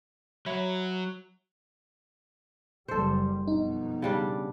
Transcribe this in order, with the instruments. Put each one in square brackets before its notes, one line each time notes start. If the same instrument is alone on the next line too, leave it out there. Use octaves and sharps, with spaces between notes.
[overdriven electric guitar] F#3 [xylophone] C#5 E5 B5
[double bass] F#1 G3 [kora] A4 C5
[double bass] F2 B2 [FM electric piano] D#4
[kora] C#3 G3 D4